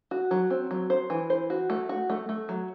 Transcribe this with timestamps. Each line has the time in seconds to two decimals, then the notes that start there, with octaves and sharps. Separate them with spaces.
0.11 F#4
0.31 F#3
0.50 C4
0.71 F#3
0.90 C5
1.10 E3
1.30 C5
1.50 F#4
1.70 A3
1.89 F#4
2.10 A3
2.29 A3
2.49 F#3